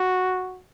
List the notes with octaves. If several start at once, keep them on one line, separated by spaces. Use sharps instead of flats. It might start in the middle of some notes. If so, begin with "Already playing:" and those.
Already playing: F#4